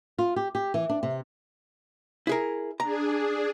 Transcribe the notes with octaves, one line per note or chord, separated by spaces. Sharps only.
F4
G4
G4
E3
D4
C3
E4 G#4 A#4
D4 G#4 A#5